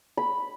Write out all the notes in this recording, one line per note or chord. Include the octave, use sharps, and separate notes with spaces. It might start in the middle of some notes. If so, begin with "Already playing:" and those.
B5